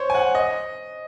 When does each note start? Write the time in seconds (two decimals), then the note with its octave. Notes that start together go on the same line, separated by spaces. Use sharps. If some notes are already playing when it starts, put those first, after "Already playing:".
Already playing: C5 C#5
0.10 G#5
0.15 F#5
0.35 D#5